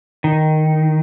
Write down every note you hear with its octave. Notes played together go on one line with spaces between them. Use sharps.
D#3